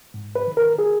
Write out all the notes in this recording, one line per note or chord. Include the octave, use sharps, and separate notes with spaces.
G#2
B4
D#3
A#4
G#4